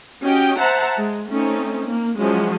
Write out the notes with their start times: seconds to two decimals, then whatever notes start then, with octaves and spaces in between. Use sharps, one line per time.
0.23 C#4 F#4 G4 D#5 G5
0.59 C5 E5 F#5 A5 A#5
0.98 G#3
1.29 A3 C4 C#4 D#4
1.87 A#3
2.17 F3 F#3 G#3 C#4 E4 F#4